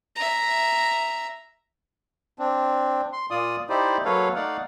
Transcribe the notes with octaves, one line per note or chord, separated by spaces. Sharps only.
E5 A#5
C4 D4
C6
A#2 F4 D5 D#6
D#4 E4 G4 C5 D5
F#3 A#3 A4 B4 C#5 F5
A3 D#4 D5 F5 F#5